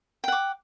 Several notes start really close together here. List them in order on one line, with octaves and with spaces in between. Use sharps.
G5 F#5 D6